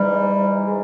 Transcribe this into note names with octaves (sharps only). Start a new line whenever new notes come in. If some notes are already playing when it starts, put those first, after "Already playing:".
Already playing: G#2 E3 G3
G#3